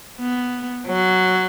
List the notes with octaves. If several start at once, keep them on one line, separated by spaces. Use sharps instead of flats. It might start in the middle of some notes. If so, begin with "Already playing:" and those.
B3
F#3